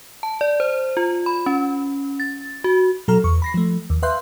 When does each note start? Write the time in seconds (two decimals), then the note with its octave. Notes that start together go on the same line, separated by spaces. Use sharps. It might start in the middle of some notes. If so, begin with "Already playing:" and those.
0.23 A5
0.41 D5
0.60 C5
0.97 F4
1.26 B5
1.46 C#4
2.20 A6
2.64 F#4
3.08 B2 F#3 A4 A#5 F6
3.24 E2 C#6
3.42 B5 A#6 C7
3.54 F3 A3
3.90 D#2
4.03 B4 E5 F5 C6 F#6 G6